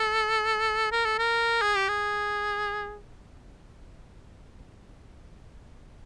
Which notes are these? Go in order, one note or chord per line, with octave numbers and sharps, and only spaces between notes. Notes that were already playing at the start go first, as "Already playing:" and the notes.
Already playing: A4
A#4
A4
A#4
G#4
G4
G#4